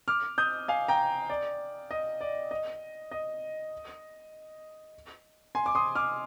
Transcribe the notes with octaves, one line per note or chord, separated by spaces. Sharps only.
D6 F6
D#6 G6
F5 G#5
G5 A#5
D5
D#5
D5
D#5
D#5
G#5 C6
D6
C6 D#6
D6 F6